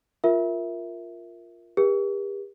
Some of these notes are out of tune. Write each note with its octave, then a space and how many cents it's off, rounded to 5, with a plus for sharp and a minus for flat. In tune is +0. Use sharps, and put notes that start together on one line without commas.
F4 +0 A#4 +0 E5 +0
G4 +35 A#4 +45